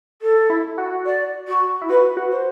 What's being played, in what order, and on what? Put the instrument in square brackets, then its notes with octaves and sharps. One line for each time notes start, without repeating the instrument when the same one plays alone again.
[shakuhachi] A4
[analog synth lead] E4
F#4
[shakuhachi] D5
F#4
[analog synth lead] E4
[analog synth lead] F#4 [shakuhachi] B4
[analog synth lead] F#4
[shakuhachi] C5